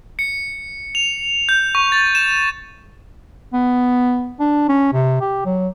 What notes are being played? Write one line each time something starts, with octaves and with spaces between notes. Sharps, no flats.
C#7
F7
G6
C#6
A6
E7
B3
D4
C#4
C3
G4
F#3